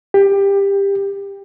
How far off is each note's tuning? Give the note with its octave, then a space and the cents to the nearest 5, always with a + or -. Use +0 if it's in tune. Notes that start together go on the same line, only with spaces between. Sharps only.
G4 +20